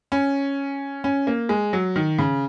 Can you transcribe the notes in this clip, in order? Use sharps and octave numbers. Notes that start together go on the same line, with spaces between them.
C#4
C#4
A#3
G#3
F#3
D#3
C#3